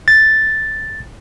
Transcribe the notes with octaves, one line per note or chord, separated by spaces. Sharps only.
A6